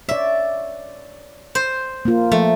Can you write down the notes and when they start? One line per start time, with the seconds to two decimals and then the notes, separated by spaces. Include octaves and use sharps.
0.09 C#5 D5 E5
1.55 C5
2.05 A#3 F4
2.32 F3 A3